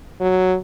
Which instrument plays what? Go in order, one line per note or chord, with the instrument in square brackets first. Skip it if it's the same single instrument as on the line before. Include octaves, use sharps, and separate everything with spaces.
[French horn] F#3